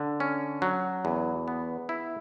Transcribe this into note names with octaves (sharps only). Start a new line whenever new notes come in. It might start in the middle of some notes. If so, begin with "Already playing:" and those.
Already playing: D3
C#4
F#3
E2
B3
E4